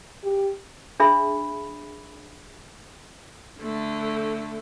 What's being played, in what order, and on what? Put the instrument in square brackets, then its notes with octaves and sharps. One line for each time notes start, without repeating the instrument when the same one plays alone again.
[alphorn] G4
[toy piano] D4 G#4 E5 B5
[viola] D3 A3